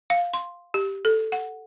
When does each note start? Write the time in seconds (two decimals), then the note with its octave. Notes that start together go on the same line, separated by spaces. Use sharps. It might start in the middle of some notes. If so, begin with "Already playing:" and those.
0.10 F5
0.34 C6
0.74 G4
1.05 A4
1.32 F#5